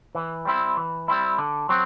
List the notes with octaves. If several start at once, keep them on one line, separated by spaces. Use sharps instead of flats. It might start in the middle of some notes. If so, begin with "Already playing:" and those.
E3
G3 C4 E4
E3
G3 C4 E4
D3
F#3 C4